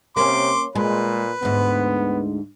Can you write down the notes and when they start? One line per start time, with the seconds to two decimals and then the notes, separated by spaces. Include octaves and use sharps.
0.17 C3 A#3 C#4 C6 D6
0.75 A#2 G#3 B4
1.43 D2 G#2 B3